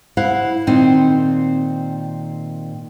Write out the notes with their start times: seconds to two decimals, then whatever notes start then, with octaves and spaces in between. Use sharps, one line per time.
0.17 E4 C5 F5 F#5
0.67 A#2 D#3 C4 D#4